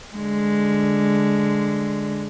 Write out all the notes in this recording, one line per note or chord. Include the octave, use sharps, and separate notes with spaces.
D3 G#3